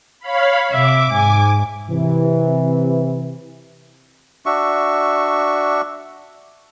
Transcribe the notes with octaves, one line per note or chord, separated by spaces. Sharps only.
C#5 F5 B5
C3 E5 D6
G#2 G#5
C3 E3
D4 F#4 E5 C#6